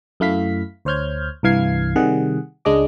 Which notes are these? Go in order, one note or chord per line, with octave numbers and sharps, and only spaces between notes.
F#2 A3 E4 F5 B6
D2 C5 C#5 F6 G6 G#6
C2 G2 E3 F5 G#6 C7
C3 D#3 G3 G#4 F#5
C#2 G#3 D4 G#4 D#5 D6